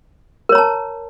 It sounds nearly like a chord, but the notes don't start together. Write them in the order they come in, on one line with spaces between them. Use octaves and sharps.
A#4 C#5 A#5 A5